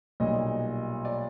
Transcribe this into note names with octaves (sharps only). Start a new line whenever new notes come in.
B1 A#2 G3 D#5
D5